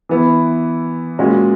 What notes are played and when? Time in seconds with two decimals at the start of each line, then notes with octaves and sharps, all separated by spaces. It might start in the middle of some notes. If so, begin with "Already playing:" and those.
0.09 E3 B3 E4
1.19 A#2 G#3 C#4 F#4